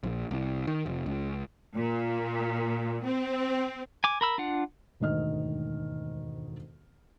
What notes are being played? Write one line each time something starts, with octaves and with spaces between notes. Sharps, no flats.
A#1
C2
D#3
F1
C#2
A#2
C4
G#5 D6
A#4 B5 E6
D4 F4 F#5
E1 D2 G#2 D#3 D#5 F6